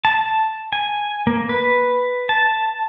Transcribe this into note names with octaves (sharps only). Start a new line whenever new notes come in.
A5
G#5
A#3
B4
A5